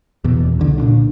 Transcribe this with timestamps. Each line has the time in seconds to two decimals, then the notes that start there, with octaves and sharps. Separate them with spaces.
0.24 E2 B2
0.60 C2 D3
0.78 A#2 D4